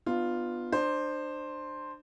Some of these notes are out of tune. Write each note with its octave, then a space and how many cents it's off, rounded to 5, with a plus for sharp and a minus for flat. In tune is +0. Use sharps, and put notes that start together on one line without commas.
B3 +5 D4 +45 F4 +0
D4 +30 C5 +5